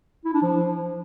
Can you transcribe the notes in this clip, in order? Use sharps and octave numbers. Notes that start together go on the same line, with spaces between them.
E4
D4
F3